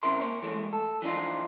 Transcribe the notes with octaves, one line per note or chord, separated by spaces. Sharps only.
C2 C#3 C4 E4 A#4 C6
A#3 C#5
E3 G#3 A3
A4
E3 F3 D4 D#4 F4